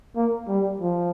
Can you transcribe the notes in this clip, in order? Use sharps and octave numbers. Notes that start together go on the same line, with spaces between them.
A#3
G3
F3